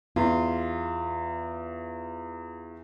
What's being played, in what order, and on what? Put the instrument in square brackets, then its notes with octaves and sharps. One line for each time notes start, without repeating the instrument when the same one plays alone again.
[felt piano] E2 [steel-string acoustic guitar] F4